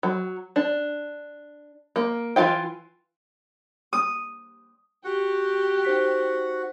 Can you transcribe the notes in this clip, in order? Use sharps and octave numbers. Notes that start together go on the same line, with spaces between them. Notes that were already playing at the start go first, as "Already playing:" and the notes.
F#3
D4
A#3
E3 F#3 F4 F5 G5
D#6
F#4 G4 F#5
D#4 C5 B6